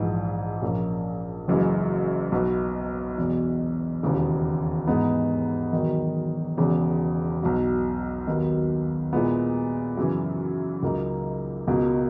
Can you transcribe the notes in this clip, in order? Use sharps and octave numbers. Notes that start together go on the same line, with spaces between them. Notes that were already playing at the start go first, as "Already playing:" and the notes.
Already playing: A#1 G#2 E3
A#1 A#2 A#3 C#4
F#1 F#2 E3 G#3
B1 B2 F#3 B3
E1 E2 B2
E1 D#2 C#3 E3
G#2 E3 G#3 B3 D#4
E1 E2 D#3 F#3
E1 E2 C#3
B1 B2 F#3
D#2 D#3 F#3 B3
A#2 G#3 B3 E4
F#2 C#3 E3
C#2 C#3 F#3 A#3 D#4
C#2 B2 A#3